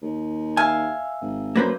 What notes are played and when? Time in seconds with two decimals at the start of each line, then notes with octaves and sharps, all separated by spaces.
0.02 D#2
0.57 E5 F5 G#5
1.21 G#1
1.55 F#2 A#3 B4 C5